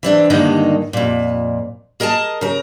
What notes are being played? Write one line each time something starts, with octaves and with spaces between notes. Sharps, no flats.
E3 C4 D4
G2 D3 D#3 G#3 A#3 D#4
F2 A#2
G#4 A#4 D#5 G#5 A5
C#3 A#4